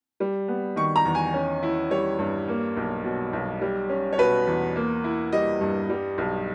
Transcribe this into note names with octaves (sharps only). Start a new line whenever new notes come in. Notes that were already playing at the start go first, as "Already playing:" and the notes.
G3
B3
D#3 C#6
A#5
E2
G#5
C#4
E4
G3 C#5
G2
A#3
B1
B2
B1
G3
C#4
C#5
B2 B4
E2
A#3
E4
G3 D#5
G2
G3
B1